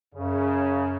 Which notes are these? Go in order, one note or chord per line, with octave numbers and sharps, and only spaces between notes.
F#2 C#3